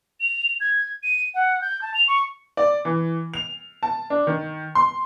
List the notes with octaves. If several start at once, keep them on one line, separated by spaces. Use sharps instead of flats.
F7
G#6
D#7
F#5
G6
A5
F7
C#6
D5
E3
F7
A5
D4
D#3
C6